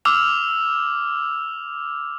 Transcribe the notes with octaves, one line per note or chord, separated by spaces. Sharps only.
D6 E6 F6 F7